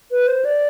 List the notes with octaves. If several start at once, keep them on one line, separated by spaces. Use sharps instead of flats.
B4
C5
D5